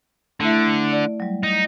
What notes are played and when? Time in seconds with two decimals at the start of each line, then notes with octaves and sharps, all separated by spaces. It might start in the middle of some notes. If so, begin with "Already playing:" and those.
0.40 D3 A3 E4 E5
0.93 D5
1.20 F#3 G3
1.43 D#4